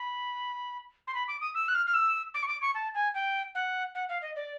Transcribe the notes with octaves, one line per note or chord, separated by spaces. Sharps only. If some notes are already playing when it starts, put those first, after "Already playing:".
Already playing: B5
C6
B5
D6
D#6
E6
F#6
F6
F6
E6
D6
C#6
D6
C#6
A5
G#5
G5
F#5
F#5
F5
D#5
D5